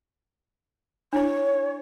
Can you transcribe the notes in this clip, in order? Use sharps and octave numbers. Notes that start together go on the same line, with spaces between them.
D4 E4 C#5